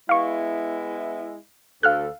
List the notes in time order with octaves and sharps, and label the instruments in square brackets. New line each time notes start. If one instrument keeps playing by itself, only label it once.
[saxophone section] G#3 B3 E4 [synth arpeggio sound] F5 C#6
[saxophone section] D2 A4 [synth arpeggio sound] F5 F6 F#6